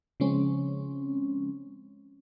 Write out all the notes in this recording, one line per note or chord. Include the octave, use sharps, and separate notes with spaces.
C#3 F3 G#3 C4 C#4